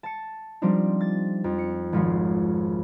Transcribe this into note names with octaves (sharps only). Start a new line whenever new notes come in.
A5 C#7
F3 G3 C4 D4 D#4
A6
F2
C#7
G#1 F3 C#5 C7